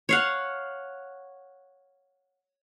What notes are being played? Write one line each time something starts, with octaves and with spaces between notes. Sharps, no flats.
C#5 F5 F#5